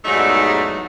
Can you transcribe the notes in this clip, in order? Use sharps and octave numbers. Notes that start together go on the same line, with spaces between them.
E2 G#2 F#3 G3 A3 D#4